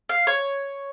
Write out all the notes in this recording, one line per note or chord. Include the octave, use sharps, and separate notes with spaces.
F5
C#5